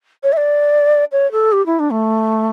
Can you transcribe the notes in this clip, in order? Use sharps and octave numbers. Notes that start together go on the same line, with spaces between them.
C#5
E5
D5
C#5
A4
G4
E4
D4
A3